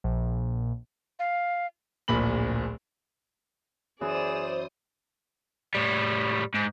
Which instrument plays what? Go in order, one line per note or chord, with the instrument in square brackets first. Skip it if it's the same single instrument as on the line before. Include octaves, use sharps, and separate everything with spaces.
[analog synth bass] A#1
[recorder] F5
[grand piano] D1 A#1 A#2 B5 F#7
[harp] F#2 E3 [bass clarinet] G#4 [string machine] C5 D#6 [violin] D5 E7
[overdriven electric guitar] A2 G3
G#2